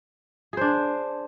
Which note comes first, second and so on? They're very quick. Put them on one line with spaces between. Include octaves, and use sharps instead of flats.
G#4 C5 D4